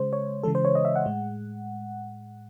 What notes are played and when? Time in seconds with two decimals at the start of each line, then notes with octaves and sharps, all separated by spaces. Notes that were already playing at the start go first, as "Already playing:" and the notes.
Already playing: C#3 G#3 C5
0.13 C#5
0.43 C#3 E3 G#3 A4
0.55 C5
0.65 C#5
0.75 D#5
0.85 E5
0.96 F#5
1.06 A2 G#3